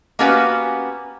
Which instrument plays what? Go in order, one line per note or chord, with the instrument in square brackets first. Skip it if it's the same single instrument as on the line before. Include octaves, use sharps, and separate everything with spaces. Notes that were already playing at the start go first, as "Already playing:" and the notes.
[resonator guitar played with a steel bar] A#3 B3 C#4 F#4 G4 B4